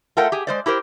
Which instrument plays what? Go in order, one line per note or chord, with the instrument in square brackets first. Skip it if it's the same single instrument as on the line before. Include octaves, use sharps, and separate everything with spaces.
[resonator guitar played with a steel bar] A3 F4 A4 A#4 F#5 G5
G4 G#4
G#3 C5 D5
E4 G4 A#4 C5